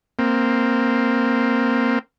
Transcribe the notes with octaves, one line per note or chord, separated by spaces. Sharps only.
A#3 C4